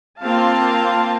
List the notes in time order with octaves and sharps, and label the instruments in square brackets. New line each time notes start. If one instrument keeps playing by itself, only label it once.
[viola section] A#3 C4 F4 F5 A5